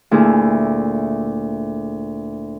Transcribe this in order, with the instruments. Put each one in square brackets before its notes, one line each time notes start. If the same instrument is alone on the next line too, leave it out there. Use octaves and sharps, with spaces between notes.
[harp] D2 A#2 E4 G#4